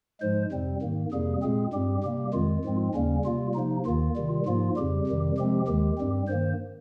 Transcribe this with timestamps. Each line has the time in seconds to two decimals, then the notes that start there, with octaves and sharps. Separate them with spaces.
0.21 G#2 F3 G#3 C5
0.52 F2 C3 G3 C4
0.82 G#2 D#3 A#3
1.12 F2 C3 G3 A#3 G#4
1.42 A#2 G#3 C4 G#4
1.73 G2 G3 C4 G4
2.03 C3 G3 A#3 G4
2.33 F2 D#3 G#3 F4
2.65 G#2 F3 G#3 C4
2.94 D#2 C#3 G3 A#3 C#4
3.25 C3 G3 A#3 F4
3.54 C3 F3 A#3 D#4
3.86 D#2 D#3 A#3 F4
4.16 C3 D#3 G3
4.46 G#2 F3 A#3 F4
4.76 F2 C#3 G3 G4
5.07 F2 C3 D#3 G3
5.37 C3 F3 G#3 C4 G4
5.67 D#2 D#3 G#3 G4
5.98 G2 G3 C4
6.28 G2 D#3 A#3 C5